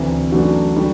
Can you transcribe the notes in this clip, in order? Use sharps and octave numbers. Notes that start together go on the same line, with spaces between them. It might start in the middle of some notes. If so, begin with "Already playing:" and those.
Already playing: D2 C3 E3
F#2 E3 A3 D4 F#4
D3 G3 D4 F#4